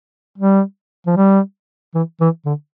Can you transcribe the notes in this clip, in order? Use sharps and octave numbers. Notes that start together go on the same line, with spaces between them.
G3
F3
G3
E3
E3
D3